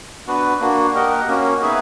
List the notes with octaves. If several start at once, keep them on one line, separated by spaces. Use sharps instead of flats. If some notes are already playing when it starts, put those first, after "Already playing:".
B3 D4 F#4 B4
A#3 D4 F#4
G4 A#4 D#5 F#5
A#3 C#4 F#4
B3 D#4 G#4 B4 E5